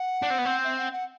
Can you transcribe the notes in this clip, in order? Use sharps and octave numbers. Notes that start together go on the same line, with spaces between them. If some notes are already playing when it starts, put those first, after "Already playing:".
Already playing: F#5
D4
C4
B3
C4
E5
F#5
F#5